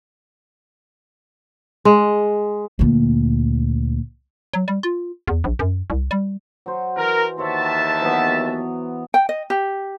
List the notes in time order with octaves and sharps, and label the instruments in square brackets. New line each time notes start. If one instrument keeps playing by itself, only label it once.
[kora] G#3
[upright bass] D2 A#2
[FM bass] F#3
G3
F4
E2
A#1
F#2
C2
G3
[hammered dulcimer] F#3 C5
[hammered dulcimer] E3 [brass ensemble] A#4
[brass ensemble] D#2 E5 A5 [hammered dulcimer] C5 C#5 F#5
[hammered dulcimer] E3 F#3 B3
[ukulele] G5
D#5
G4